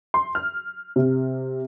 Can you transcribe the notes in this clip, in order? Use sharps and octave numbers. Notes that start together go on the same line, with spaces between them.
C6
F6
C3